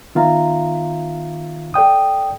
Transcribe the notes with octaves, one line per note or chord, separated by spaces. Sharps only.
D#3 B3 F4 E5 F5 A#5
A4 D5 G5 D#6